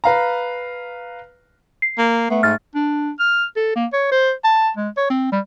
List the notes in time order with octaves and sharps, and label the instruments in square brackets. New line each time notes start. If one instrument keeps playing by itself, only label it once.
[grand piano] B4 F5 A#5
[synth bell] C7
[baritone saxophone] A#3
[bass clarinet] A3 [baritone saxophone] B3
[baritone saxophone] G#2 [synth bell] F6 A6
[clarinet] D4
F6
A4
A#3
C#5
C5
A5
G#3
C#5
C4
G3